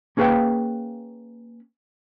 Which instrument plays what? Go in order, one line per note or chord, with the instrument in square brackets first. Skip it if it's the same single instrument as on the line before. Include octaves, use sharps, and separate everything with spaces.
[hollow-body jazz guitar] A#3 C#4 G#4 B4 F5 G5